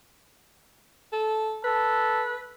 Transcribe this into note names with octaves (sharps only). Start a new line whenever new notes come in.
A4
A4 B4